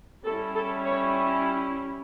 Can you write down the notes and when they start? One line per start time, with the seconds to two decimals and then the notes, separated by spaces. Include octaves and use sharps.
0.24 G3 C#4 E4 A4
0.55 A4
0.86 C#5